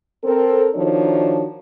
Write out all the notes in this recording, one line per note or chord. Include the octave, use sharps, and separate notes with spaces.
C4 A4 A#4
D#3 F3 D4 D#4 F#4 C#5